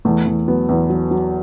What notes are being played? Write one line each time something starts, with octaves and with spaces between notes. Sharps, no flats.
E2 A3
E2
F#3 B3
E2
F#3
F#3